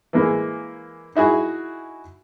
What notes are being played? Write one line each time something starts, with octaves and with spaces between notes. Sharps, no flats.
E3 G#3 A#3
D#4 E4 F#4 G#4